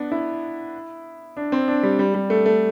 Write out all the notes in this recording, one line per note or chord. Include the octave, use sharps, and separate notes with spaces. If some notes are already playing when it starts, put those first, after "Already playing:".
Already playing: B3 D4
E4
D4
C4
D4
G3
G3
G3
A3
A3